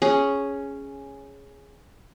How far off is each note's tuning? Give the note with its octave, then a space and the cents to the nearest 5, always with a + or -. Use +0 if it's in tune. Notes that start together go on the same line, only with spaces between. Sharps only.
C#4 +0 G#4 +0